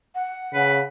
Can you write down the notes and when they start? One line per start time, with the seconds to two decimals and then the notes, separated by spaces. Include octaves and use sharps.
0.15 F#5
0.54 C#3 B4